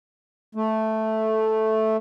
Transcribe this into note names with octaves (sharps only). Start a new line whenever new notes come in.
A3